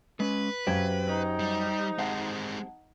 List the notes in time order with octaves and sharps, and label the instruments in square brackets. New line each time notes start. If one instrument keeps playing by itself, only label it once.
[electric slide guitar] G#3 C#4 [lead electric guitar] B4
[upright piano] F#2 F5 G#6 [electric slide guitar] G4 C5 G5
[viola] D#4
[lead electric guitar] G3
[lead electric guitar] G#3 C4 [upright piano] F#5 A5